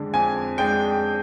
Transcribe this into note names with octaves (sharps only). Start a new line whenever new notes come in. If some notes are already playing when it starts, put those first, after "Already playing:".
Already playing: F2 D3 G#3 D4
F2 G#5
G#3 D4 G5